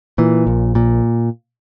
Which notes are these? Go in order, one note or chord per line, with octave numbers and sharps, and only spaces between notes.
A#2 E3
A#1
A#2